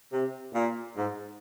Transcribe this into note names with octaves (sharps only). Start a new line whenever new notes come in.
C3
A#2
G#2